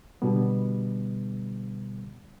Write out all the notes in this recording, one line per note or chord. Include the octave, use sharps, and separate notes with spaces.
B2 D3 G3 B3